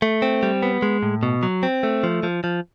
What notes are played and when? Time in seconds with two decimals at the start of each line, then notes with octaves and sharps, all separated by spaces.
0.02 A3
0.22 C4
0.43 G3
0.62 B3
0.82 G#3
1.03 A2
1.23 B2
1.43 F#3
1.63 C4
1.83 A3
2.03 F3
2.23 F3
2.44 F3